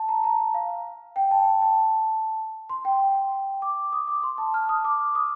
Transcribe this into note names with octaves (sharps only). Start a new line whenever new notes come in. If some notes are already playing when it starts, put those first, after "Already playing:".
Already playing: A5
A#5
A#5
F5
G5
A5
A5
C6
G5
D6
D#6
D6
C6
A5
F6
D#6
D6
D#6